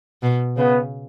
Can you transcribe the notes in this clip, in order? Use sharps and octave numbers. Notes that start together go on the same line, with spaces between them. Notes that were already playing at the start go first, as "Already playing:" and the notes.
B2
C#3 B3